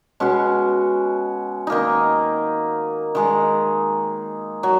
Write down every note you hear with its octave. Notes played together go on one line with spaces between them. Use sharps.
B2 G#3 C#4 F#4
D#3 A#3 D#4
D#3 G#3 D#4 G#4
F#3